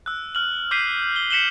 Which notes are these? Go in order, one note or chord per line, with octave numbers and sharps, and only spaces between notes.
E6 F#6
F6 F#7
D6 F6 G6 B6 C7 D#7
G7
B6 C#7 E7 F#7 G7